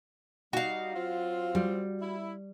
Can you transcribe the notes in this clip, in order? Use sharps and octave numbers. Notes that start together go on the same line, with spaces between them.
G3 D#4 F#4 F5
F#3 C4 F4
G3
E4